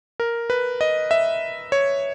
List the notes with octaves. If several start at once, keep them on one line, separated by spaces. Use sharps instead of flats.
A#4
B4
D#5
E5
C#5